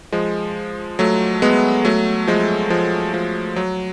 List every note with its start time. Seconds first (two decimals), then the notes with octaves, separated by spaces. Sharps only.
0.12 F3 G#3
0.99 F#3 A3
1.42 G#3 B3
1.85 F#3 A3
2.27 F3 G#3
2.70 F3 G#3
3.14 F3
3.56 F#3